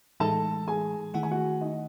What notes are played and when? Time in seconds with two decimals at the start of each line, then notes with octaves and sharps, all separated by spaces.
0.20 A2 E3 G#3 D#4 A4 A5
0.68 G#4 G#5
1.14 D#3 A3 E4 G#4 F#5
1.23 G#5
1.31 F#4 F#5
1.61 D#4 D#5